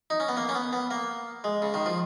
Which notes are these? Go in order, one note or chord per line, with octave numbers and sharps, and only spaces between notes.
D#4
C#4
B3
A#3
C#4
B3
B3
A#3
G#3
C#3
D#3
F3